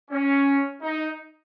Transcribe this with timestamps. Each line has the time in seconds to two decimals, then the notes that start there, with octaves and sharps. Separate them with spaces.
0.11 C#4
0.82 D#4